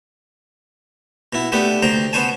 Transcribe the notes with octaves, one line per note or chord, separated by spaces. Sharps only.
B2 E4
A3 B3 D4 G4
D2 C5 G5 A#5
B3 C#4 C5 G#5 A5